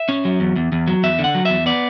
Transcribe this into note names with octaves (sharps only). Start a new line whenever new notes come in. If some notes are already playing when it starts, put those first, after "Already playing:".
Already playing: E5
C#4
F#3
E2
E2
E2
F#3
E2 E5
D3
F#5
F#3
E2 E5
B3 D5